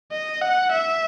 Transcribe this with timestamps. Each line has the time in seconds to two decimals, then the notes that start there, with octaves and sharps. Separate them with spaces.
0.12 D#5
0.41 F#5
0.72 E5